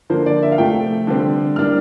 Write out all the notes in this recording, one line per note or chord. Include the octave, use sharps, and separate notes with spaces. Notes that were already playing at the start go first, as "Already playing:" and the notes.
D3 F3 A#3 C5
D5
E5
F5
C3 F3 A3 G5
D3 G3 C4
A2 G3 A#3 D4 F6